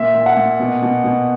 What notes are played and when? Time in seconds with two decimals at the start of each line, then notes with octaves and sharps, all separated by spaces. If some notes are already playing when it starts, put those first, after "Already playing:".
Already playing: A#2 E5
0.15 A#2
0.26 F#5
0.37 A#2
0.59 B2
0.82 B2
1.04 B2